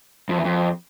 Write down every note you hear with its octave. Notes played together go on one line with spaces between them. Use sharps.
F2
E2
F2